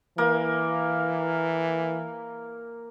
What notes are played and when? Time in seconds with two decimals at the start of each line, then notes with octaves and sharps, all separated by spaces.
0.18 E3 A#3